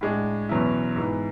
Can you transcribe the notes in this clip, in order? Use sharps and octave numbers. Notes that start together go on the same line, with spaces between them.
A2 G#3 D4
E2 B2 F#3 C#4 E4
G#2 E3 B3